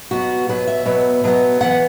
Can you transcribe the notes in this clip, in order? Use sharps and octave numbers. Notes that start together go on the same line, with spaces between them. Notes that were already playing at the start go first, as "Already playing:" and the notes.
B2 F#3 B3 F#4
B2 F#3 B3 B4
E5
B2 F#3 B3
B2 F#3 B3
E3 B3 F#5